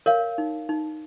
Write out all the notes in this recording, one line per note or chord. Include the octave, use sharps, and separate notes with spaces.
A#4 C#5 F5
D#4
D#4